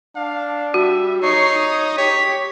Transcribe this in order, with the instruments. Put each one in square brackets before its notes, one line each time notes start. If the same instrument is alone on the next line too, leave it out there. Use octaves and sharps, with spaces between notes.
[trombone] D4 [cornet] F5
[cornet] G3 [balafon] F#4 [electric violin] E5
[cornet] D#4 [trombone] C#5 [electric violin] C#6 C7
[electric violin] D#6
[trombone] G4 [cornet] C#5 [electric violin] B6